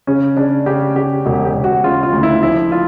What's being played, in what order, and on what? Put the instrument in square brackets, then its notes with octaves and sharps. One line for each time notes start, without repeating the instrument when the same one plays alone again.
[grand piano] C#3 C#4
C#3 D4
C#3 G4
C#3 G4
E1 F#4
G4
E1
F#4
C#3 F4
F4
D2
E4
F3 E4
F4